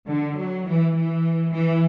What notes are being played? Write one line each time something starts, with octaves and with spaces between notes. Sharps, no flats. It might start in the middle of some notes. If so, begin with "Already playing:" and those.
D3
F#3
E3
E3
E3